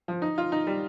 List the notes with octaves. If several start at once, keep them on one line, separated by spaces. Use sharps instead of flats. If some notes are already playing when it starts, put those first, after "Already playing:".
F3
D#4
F4
D#4
G3